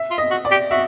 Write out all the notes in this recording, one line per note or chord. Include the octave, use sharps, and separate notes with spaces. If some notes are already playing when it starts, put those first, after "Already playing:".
Already playing: E5
F4
D#5
F#4
D5
G4
F#4 E5